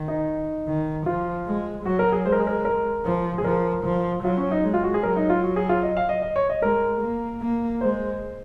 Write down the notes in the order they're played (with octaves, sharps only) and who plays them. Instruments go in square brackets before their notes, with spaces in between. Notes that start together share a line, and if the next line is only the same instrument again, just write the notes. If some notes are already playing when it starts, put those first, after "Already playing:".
Already playing: [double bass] D#3
[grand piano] D#4
[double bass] D#3
[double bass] F3 [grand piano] F4
[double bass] G#3
[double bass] F#3 [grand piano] F#4
[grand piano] A#4
G#4
[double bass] G#3 [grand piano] C5
[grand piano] A#4
G#4
A#4
A#4
[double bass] F3
[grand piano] G#4
[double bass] F3 [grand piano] A#4
[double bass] F3
[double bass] F#3 [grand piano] F4
[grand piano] C#4
D#4
[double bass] G#3
[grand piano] F4
F#4
G#4
[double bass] F#3 [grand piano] A#4
[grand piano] D#4
F4
F#4
G#4
F4
D#5
F5
D#5
D#5
C#5
D#5
[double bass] G#3 [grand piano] A#4
[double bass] A#3
A#3
[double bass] G#3 [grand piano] C5